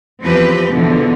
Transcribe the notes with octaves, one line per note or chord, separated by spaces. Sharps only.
E2 F3 C4 G4 B4
E2 B2 D3 E3 F3